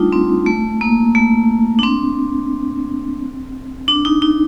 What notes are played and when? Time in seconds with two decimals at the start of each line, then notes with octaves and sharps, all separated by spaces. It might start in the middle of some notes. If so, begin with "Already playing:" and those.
Already playing: G3 A3 D4 D#4 F4
0.13 C4
0.46 A3
0.81 A#3
1.15 A3
1.79 D4
1.83 C4
3.88 D4
4.05 D#4
4.22 D#4